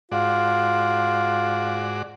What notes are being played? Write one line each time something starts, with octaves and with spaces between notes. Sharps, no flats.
G#2 F4 F#4 D5